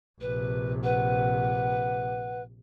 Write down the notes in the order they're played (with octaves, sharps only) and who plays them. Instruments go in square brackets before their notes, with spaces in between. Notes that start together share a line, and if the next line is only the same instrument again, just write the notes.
[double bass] A#1 C3 [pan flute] B4
[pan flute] B4 [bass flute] F#5